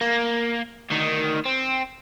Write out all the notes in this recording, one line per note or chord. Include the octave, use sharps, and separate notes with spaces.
A#3
D2 D#3
C4